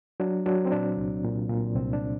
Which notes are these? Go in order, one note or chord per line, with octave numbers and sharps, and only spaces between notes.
F#3 D4
F#3 D4
C4
A#2 D4
C2
A#2
A#2
C2 C4
D4